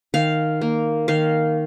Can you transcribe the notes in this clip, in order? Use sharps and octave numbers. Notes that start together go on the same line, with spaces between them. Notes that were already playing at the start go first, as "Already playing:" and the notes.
D#3 F5
A#3
D#3 F5